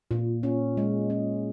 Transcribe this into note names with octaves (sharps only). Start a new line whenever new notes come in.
A#2
C#4
G#3
C#4